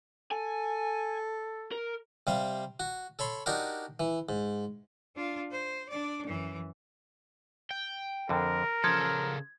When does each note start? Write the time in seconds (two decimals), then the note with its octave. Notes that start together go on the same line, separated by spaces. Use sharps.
0.32 A4 G#5
1.71 A#4
2.27 C3 G3 F5
2.80 F#4
3.19 A4 C#5 B5 C6
3.46 D4 D#4 F#4 G4 A#4
4.00 E3
4.29 G#2
5.16 D4 F4
5.51 C5
5.89 D4 D5
6.26 F#2 E3
7.71 G5
8.29 F2 D3 A#4
8.84 C#3 F3 A4 G#6